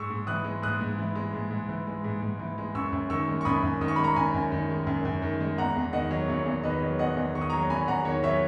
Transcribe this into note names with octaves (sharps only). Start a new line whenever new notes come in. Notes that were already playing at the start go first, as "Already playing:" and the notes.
Already playing: G#2 C#6 E6
G#2
E3 D#6 F#6
G#3
G#2 D#6 F#6
G#2
E3
G#3
G#2
G#2
E3
G#3
G#2
G#2
E3
G#3
F#2 C#6 E6
F#2
D#3 C#6 E6
G#3
C#6
F#2 B5 D#6
F#2
D#3 D#6
C#6
G#3 B5
A#5 C#6
F#2 G#5 B5
F#2
D#3
G#3
F#2
F#2
D#3
G#3
E2 F#5 A#5
E2
D#3 D#5 F#5
F#3
E2 C#5
E2
D#3 B4 D#5
F#3
E2 D#5 F#5
E2
D#3 C#6
D#6
F#3 A#5 C#6
E2 G#5 B5
E2 F#5 A#5
D#3 C#5
F#3 C#5 E5